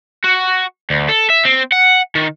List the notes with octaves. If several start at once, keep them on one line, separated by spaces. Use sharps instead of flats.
F#4
D2
A4
E5
C4
F#5
D#3